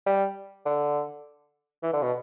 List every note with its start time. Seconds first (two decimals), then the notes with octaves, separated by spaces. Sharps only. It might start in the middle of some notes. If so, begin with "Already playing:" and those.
0.06 G3
0.66 D3
1.83 E3
1.93 D3
2.02 B2